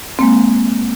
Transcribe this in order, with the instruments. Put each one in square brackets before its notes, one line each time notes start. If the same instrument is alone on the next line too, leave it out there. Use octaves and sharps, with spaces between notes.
[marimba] G#3 A#3 C4